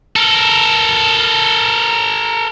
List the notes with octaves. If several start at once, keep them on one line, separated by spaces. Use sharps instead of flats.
A4 A#4